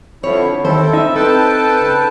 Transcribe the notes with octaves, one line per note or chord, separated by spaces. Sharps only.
D3 F3 C4 E4 C#5
D#2 C4 E4 A4 C5
D#4 E5
C4 A4 B4 G5 A5
C#3